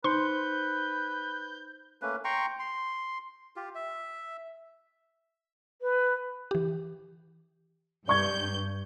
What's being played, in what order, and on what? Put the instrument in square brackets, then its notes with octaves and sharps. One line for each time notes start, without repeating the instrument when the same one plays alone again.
[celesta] D#4 C5 C#7 [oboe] B4 [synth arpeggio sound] C6 [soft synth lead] G6
[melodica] A3 A#3 C#4 B4
G5 A#5 C6 C#6
C6
F4 G4
E5
[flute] B4
[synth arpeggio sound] E3 G4
[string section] G2 G6 [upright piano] D5 C#6 G#6